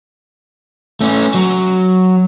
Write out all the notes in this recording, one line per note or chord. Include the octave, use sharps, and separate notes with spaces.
A3 C#4
F#3